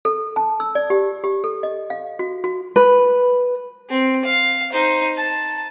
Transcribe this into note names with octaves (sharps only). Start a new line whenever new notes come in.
A4
A5
E6
D5
G4
G4
A4
D#5
F5
F#4
F#4
B4
C4
F5
D#4 C5
A5